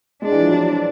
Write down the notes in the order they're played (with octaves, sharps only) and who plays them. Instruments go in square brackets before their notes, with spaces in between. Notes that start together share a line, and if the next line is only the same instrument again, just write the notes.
[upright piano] G#3 [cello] D4
[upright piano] E3
F3
F#3